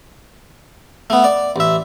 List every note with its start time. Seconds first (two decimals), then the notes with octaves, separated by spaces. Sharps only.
1.10 A3 B3
1.24 D5
1.56 A1 E5